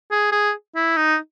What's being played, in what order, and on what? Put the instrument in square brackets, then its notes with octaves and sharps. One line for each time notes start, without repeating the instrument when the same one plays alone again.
[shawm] G#4
G#4
E4
D#4